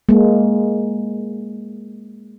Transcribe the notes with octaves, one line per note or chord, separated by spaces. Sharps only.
G#3 A#3